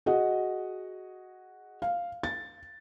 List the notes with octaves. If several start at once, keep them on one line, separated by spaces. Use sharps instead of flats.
F#4 G#4 D#5 F#5
F5
A6